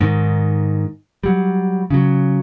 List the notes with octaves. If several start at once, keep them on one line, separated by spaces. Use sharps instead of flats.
G#2 D#3
F#3 G3
C#3 F#3